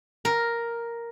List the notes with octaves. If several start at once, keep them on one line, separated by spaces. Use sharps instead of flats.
A#4